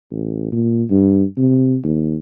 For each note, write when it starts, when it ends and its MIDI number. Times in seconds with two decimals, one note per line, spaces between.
0.11 0.51 33
0.52 0.83 46
0.90 1.24 43
1.37 1.77 48
1.84 2.16 39